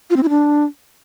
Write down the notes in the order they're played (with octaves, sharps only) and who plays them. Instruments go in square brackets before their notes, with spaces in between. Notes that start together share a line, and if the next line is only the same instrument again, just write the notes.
[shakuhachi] F4
C4
E4
D4